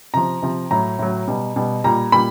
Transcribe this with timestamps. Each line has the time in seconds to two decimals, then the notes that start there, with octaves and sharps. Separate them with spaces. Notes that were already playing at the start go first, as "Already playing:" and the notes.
0.14 C3 F3 A#5
0.42 C3 F3
0.71 A2 F#3 A#5
0.99 A2 F#3
1.28 B2 G3
1.56 B2 G3
1.84 A#2 G3 A#5
2.12 A#2 G3 B5